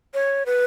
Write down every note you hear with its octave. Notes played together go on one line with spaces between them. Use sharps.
C#5
B4